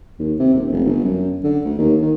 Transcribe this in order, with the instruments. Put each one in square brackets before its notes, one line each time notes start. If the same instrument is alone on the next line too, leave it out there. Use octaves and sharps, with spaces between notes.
[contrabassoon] D#2
C3
D#1
F1
G1
F#2
D3
D2
D#2
D#3